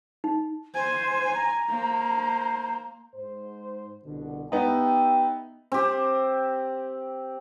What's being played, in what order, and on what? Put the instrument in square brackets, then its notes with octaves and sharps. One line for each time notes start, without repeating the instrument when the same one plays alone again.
[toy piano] D#4
[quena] C5 [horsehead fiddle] G#5
[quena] A#5
[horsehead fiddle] A#3 C5
[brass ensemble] G#2 C5
C2 B2 D3
[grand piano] B3 D#4 [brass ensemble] G4 E5 G5
[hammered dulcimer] C4 G4